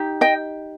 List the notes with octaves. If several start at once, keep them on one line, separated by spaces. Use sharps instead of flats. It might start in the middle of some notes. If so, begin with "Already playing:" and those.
Already playing: D#4 G4
D#5 G5